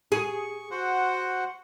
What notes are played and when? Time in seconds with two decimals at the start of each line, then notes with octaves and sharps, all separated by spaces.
0.12 G#4 C#6
0.71 F#4 C5 F#5